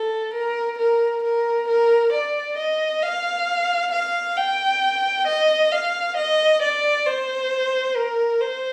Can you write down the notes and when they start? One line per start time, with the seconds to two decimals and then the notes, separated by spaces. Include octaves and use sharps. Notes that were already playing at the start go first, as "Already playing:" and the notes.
Already playing: A4
0.34 A#4
0.78 A#4
1.24 A#4
1.68 A#4
2.13 D5
2.58 D#5
3.03 F5
3.92 F5
4.37 G5
5.27 D#5
5.72 F5
6.17 D#5
6.62 D5
7.07 C5
7.96 A#4
8.41 C5